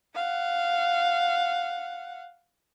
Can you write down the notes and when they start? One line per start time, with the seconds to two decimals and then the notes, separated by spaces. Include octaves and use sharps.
0.15 F5 F#5